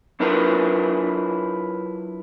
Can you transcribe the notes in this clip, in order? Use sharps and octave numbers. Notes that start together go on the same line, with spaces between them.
F#3 D4 E4 F4 A#4 B4